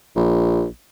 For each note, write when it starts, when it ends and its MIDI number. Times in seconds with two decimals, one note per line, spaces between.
0.16 0.67 34